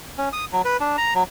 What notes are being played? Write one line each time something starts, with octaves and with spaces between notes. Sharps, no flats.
C#4
D#6
F#3
B4
D4
A#5
F#3